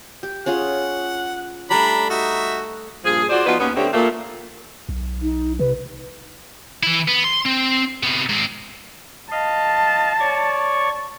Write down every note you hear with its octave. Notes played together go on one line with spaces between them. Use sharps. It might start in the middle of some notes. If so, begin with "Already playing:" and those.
G4
C#4 F4 G#4 F#5
G3 A3 D4 A#5 B5
D#4 F#4 E5
G2 A#2 F3 G#4
F4 F#4 G#4 C5 D5
F3 B3 D#4 F4 F#4 B4
D#2 B3 C#4
D3 A3 B3 C4 G4 C#5
A#2 A3 A#3
B1
D#4
C3 B4
E3 E4
B3
C6
C4
C3 B3
G#2 C4
D#5 F5 A5
C#5 D5 C#6